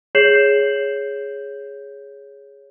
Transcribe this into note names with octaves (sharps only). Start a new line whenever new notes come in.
G#4 C#5 G6 C7 E7 F#7